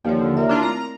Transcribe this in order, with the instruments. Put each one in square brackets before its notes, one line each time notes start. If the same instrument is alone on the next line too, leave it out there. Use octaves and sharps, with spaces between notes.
[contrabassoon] D#2 [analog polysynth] F3 [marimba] C#5 D5
[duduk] D3
[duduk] A#4 [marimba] C#5 D5 E5
[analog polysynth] D4 F4 [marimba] E4 A#5 C6
[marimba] A3 C4 [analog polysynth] A#5